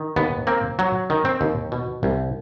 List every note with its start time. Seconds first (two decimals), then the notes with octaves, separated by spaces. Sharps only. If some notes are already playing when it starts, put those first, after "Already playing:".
Already playing: D#3
0.16 D#2 B3
0.47 A#3 C4
0.79 F#3
1.10 D#3
1.25 C4
1.41 D#2
1.72 B2
2.03 C2